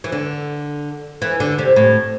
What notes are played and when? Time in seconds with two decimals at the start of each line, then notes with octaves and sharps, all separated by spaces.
0.04 E3
0.12 D3
1.22 E3
1.40 D3
1.58 C3
1.76 A2